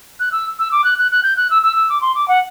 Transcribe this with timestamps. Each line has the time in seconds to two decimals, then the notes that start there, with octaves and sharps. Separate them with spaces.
0.20 F#6
0.32 E6
0.59 E6
0.72 D6
0.84 F#6
0.98 F#6
1.11 F#6
1.23 G6
1.37 F#6
1.51 E6
1.63 E6
1.76 E6
1.89 D6
2.01 C6
2.15 D6
2.28 F#5